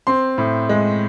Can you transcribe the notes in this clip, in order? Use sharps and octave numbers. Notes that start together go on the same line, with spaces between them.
C4 C6
A2
G#3